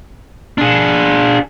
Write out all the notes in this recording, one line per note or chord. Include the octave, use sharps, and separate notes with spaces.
D4 G#4